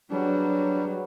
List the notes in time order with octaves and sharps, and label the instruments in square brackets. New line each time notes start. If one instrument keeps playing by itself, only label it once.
[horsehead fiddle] F#3 F#4 [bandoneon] G3 [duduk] D4 [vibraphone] G#4 B4 C#5